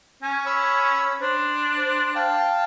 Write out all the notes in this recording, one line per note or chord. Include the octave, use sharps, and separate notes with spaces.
C#4 G#5
C#5 B5 E6
D4 C5
C5
F5 G5 A5